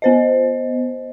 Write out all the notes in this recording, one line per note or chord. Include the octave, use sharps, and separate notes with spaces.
B3 C5 D#5